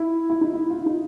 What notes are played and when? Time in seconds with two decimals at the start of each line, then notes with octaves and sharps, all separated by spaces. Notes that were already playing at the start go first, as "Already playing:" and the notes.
Already playing: E4
0.30 E4
0.41 D#4
0.54 E4
0.70 F4
0.78 E4
0.86 D#4